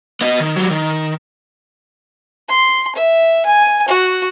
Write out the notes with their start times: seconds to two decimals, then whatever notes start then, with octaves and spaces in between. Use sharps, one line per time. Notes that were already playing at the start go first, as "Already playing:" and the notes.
0.21 B3 D#5
0.40 D#3
0.56 F#3 G3
0.70 D#3
2.49 C6
2.96 E5
3.46 G#5
3.88 F#4